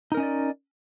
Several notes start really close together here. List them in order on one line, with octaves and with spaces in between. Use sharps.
D#4 A#4 C#4 D#5 D5